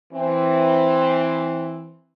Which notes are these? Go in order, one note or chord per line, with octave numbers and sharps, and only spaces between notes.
E3 C4